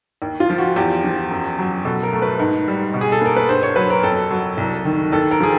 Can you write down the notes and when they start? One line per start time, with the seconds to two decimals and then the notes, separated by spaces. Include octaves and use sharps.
0.22 D#2
0.40 F4
0.50 F3
0.58 F#4
0.76 E2 G4
1.04 F3
1.31 F#2
1.59 F#3
1.85 B2 A4
2.03 A#4
2.13 A3
2.22 B4
2.39 G#2
2.68 G3
2.94 B2
3.01 G#4
3.12 A4
3.21 A#3 A#4
3.36 B4
3.49 G2 C5
3.63 C#5
3.76 F#3 B4
3.90 A#4
4.03 F2 A4
4.30 F#3
4.57 C2
4.85 D#3
5.12 D#2 A4
5.31 A#4
5.40 F3 G#4